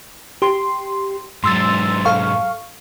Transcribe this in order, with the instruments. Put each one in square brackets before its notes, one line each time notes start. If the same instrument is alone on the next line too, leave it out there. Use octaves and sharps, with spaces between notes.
[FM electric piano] G4 C6
[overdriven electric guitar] G#2 F#3 [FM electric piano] C6 E6 A6
[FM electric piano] A4 F5 C#6